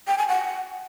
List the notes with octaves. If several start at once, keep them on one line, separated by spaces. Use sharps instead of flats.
G5
G#5
F#5